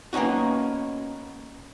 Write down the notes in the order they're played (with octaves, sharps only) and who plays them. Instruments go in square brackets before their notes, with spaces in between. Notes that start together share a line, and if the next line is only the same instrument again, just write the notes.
[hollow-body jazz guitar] A#3 B3 C#4 D#4 F#4